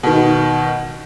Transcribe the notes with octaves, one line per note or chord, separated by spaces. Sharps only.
B2 D#3